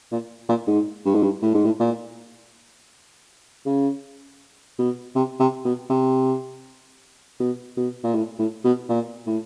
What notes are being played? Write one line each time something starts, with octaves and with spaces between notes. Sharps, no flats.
A#2
A#2
G#2
G2
G#2
G2
A2
G#2
A2
A#2
C#3
B2
C3
C3
B2
C3
B2
B2
A#2
A2
A2
B2
A#2
A2